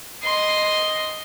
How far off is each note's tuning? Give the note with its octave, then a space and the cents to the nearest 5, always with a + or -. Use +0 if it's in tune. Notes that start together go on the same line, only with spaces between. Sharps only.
D#5 +0 C6 +0